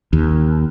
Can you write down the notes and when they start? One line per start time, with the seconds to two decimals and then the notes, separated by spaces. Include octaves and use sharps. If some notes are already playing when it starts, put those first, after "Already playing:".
0.13 D#2